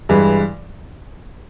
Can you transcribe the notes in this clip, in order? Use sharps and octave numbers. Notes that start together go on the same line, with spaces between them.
G2 E3 G#3